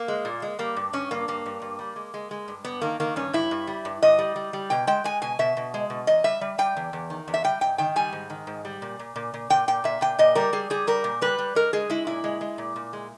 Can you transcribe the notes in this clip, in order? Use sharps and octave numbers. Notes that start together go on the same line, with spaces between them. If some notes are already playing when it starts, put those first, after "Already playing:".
Already playing: A#3
G#3
A#2
G#3
G3 A#3
G2
G2 C#4
G2 A#3
G2 A#3
G2
G2
G3
G#3
G#3
G#3
G2
G2 B3
D#3 A#3
D#3 A#3
G2 C#4
G2 E4
G2
G3
G2
G2 D#5
G3
G3
G3
B2 G5
G#3 G5
G#3 G#5
B2 G#5
B2 E5
B2
G#3
B2
E2 D#5
G3 E5
G3
G3 G5
E2
E2
D#3
E2
E5
G3 G5
G#2 G5
D#3 G5
G3 G#5
G#2
D#3
G#2
G3
A#2
A#2
A#2
A#2
A#2 G5
A#2 G5
A#2 E5
A#2 G5
A#2 D#5
G3 A#4
G3 G#4
G3 G#4
G3 A#4
A#2
G3 B4
G3
G#3 A#4
G#3 G#4
G#3 E4
A#2 E4
G#3
G#3
A#2
A#2
G#3